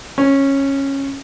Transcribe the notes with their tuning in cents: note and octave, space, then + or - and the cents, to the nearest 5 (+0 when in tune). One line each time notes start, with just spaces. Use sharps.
C#4 -15